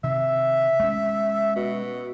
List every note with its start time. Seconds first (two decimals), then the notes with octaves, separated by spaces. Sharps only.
0.04 C3 D#3 E5
0.80 G#3 C#4
1.56 B2